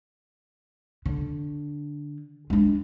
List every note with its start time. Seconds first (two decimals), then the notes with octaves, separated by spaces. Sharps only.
1.06 D3
2.50 G#3 D4